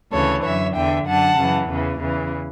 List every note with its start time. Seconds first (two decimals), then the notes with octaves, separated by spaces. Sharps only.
0.13 D2 C#3 E3 A4 C#5
0.44 F#2 D3 C#5 E5
0.75 E2 D3 E5 G5
1.07 F#2 D3 F#5 A5
1.38 F#2 C#3 E3
1.69 E2 C#3 E3
2.01 E2 C#3 E3